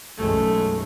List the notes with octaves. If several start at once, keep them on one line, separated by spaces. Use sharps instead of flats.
B1 F#2 G#3 A3